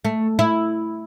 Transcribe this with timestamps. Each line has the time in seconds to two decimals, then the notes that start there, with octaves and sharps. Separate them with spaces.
0.05 A3
0.39 E4